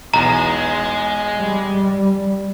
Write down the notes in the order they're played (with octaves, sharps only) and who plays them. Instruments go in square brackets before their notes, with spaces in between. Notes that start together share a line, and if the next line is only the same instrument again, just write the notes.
[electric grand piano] B1 E2 E7 [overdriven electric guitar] G#3 [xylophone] A#5
[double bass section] G3